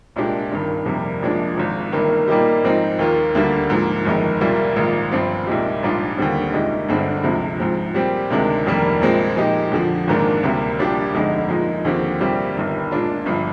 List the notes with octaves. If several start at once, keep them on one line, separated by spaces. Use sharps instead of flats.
C2 A#2 G#3 D4 G4
G#1 G2 D#3
F2 C3 G3 A#3
A#1 A#2 F3 G#3 D4
G#1 G#2 F3
G1 G2 D#3 A#3
A#2 G3 A#3 D#4 G4
G#2 F3 C4 D#4
D#2 D#3 A#3 F4
D2 D3 G3 A#3
G#2 F3 A#3
G1 F2 D#3 G#3
C2 A#2 G3 A#3 F4
A#1 G#2 D#3 A#3 F4
G1 G2 F3 C4 F4
C2 A#2 G#3 D#4 G4
A#1 G#2 G3 D4 F4
D#2 D3 G3 C4
C2 A#2 G#3 D#4 G4
G1 G2 D3 G#3 C4
D2 C3 F3 G#3
G#2 F3 C4
A#2 G3 C4 G4
D2 C3 D#3 G#3 D4
F1 F2 D#3 G3 A#3
A#1 A#2 G#3 C4
A#2 F3 G#3 D#4 G4
F2 D3 F3
G#1 G#2 D#3 A#3 D4
D2 C3 G3 A#3
A#1 A#2 G3 D4 G4
G1 F2 D3 G#3 D#4
A#2 F3 G#3 D#4
D#2 D3 F3 C4 G4
C2 A#2 G3 C4 G4
G1 G2 D#3
A#2 G#3 D4 F4
G1 G2 F3